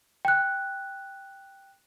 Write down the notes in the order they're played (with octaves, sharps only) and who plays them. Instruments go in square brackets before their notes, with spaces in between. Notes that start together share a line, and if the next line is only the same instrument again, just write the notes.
[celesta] G5 F#6